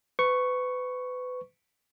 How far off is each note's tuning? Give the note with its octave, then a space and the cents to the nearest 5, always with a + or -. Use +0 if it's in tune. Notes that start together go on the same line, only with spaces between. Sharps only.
B4 +30 C#6 +0